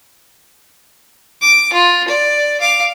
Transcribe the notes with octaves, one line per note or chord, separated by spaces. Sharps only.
D6
F4
D5
F5 D6